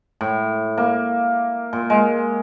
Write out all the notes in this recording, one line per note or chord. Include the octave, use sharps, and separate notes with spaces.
A2
A#3
A#2
G#3